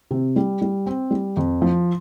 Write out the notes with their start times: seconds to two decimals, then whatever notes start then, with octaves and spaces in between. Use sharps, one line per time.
0.11 C3
0.36 G3
0.62 G3
0.86 C4
1.11 G3
1.37 F2
1.62 F3